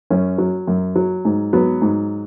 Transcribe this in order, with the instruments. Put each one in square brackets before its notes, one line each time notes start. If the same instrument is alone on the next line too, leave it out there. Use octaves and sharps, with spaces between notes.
[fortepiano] F#2 C#4
F#3
F#2
F#3
G#2
F#3 B3
G#2